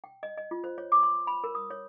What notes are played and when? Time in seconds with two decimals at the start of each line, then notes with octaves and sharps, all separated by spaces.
0.04 G5
0.23 D#5
0.38 D#5
0.51 F4
0.64 C5
0.78 C#5
0.92 D6
1.03 C6
1.27 B5
1.44 A#4
1.55 D#6
1.71 C#5